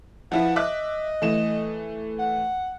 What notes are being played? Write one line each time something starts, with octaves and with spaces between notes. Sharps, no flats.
F3 E4 B4 F#5
D#5 E5 D6 F#6
E3 A3 E7
F#5